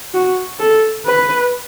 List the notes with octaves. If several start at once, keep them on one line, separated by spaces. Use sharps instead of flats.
F#4
A4
B4